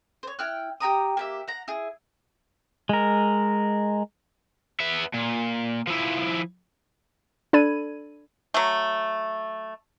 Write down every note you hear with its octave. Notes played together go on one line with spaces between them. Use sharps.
C5 C#5
E4 G5 F6 F#6
G4 G5 A#5 D#6
A#3 G4 E5
F#5 A#5
E4 G#4
G#3 A#4
B3 E5
A#2
F3 E4
D4 A4 D5 B5 G#6 D#7
F#3 A3